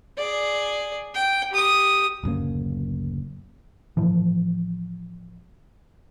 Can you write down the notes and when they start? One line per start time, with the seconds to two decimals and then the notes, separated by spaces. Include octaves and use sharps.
0.18 G#4 D5
1.15 G5
1.52 G4 D#6
2.24 D1 F#2 C#3 A#3
3.97 A2 E3 F3